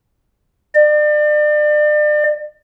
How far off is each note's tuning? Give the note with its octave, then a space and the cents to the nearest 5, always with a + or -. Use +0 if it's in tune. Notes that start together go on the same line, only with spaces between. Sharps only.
D5 +35